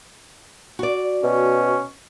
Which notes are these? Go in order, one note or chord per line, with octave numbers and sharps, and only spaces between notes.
F#4 D5
B2 C#4